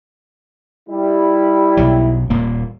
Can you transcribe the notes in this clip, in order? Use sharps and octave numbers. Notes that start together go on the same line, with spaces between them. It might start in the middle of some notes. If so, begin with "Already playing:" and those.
G3 E4
B1 F#3
D#1 A#2 A#3